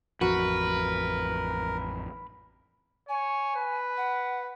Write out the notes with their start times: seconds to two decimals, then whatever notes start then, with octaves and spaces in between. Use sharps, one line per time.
0.21 A1 F2 F#4 A#4 B4
3.09 C#5 G#5
3.56 B4
3.97 F#5